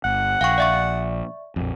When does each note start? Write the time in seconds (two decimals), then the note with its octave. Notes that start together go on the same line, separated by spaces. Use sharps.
0.04 G1 F#5
0.41 A#1 F5 G5 C#6
0.58 D5 E5 C#6
1.56 A#1 F2